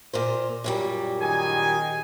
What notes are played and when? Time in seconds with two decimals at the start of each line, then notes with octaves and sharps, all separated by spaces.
0.13 A#2 A#4 C5
0.64 F#2 A#2 G3
1.20 D#3 G#4 G#5